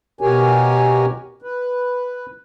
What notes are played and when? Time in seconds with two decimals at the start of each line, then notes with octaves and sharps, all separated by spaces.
0.21 B2 F#4 G4 A#4 C#5 G#5
1.42 B4